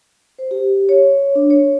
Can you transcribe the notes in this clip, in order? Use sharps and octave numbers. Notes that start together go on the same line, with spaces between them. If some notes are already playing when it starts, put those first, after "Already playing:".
C5
G4
C#5
D4
C#5